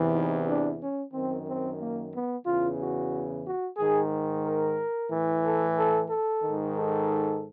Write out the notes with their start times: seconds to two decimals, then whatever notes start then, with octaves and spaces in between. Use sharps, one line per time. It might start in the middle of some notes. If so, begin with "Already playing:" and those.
Already playing: E2 C3 E3
0.13 D#4
0.47 D4
0.80 C#4
1.13 F#2 D#3 C4
1.47 C4
1.79 A#3
2.13 B3
2.45 E2 C#3 E3 F4
2.79 F#4
3.44 F#4
3.77 G#2 D#3 G#4
4.44 A#4
5.09 A2 E3
5.43 A4
5.76 A4
6.09 A4
6.42 D#3
6.47 G#2
6.76 A4